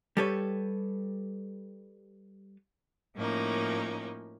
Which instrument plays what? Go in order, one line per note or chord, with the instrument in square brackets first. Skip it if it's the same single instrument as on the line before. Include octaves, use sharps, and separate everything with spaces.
[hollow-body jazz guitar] G3 G4 A4 B4 C#5
[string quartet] A2 F3 A#3 C#4 D#4